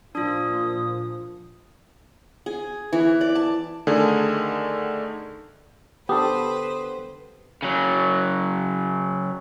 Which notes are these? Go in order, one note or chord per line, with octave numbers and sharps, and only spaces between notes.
A#2 F3 D4 F4 D#6
G#4
E3
D5
A5
D3 D#3 A3 G#4
D3 B3 G4 A4 B4 C5 D#6
C#3 F#3